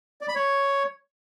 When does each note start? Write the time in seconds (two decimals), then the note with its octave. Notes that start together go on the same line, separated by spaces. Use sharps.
0.21 D5
0.28 B5
0.35 C#5